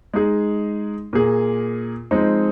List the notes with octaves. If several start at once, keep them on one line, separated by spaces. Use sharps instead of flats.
G#3 D#4 G#4
A#2 A#3 G#4
F3 G#3 C4 D#4